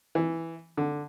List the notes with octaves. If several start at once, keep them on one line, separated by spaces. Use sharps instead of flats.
E3
D3